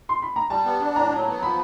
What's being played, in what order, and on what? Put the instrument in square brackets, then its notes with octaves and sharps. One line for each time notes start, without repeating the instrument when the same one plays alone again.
[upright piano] C6
B5
A#5
[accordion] G3 [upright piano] A5
[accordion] B3
D4
[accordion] A2 [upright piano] A#5
[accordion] F#3
B3
[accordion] F3 [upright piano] B5